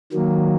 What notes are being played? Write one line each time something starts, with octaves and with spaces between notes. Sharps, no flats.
D#3 F#3 A#3